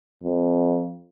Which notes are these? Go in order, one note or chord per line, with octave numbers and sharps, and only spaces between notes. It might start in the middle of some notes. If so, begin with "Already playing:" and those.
F2